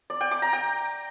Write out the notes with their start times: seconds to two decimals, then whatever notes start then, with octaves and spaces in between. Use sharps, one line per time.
0.10 D5
0.21 G5
0.31 D6
0.42 A#5
0.53 G5